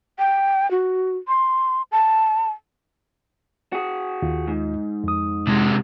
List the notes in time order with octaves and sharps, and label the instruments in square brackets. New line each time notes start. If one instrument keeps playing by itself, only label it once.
[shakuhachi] G5
F#4
C6
A5
[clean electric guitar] F#4 G#4
[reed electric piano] D#2 F4
[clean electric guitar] G#2
[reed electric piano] F2 D#6
[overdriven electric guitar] C3 G#3